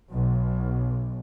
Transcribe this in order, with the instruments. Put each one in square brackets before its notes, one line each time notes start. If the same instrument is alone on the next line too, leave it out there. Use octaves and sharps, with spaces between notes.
[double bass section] B1